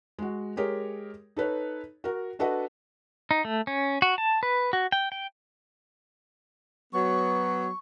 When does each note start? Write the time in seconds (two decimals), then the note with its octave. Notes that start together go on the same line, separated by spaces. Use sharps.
0.19 G#3 F#4
0.57 G#3 G4 G#4 A#4 C#5
1.37 D#4 A4 B4 C#5
2.04 F#4 A#4
2.39 D4 F#4 A4 B4 D#5 F#5
3.31 D#4
3.45 A3
3.67 C#4
4.02 F#4
4.18 A5
4.43 B4
4.73 F#4
4.92 G5
5.12 G5
6.93 F#3 B3 C#6